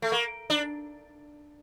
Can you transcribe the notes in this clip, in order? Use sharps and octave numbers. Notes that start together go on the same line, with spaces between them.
A3
A#3
D4